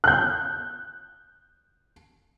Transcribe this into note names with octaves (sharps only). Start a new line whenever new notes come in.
F#6 G6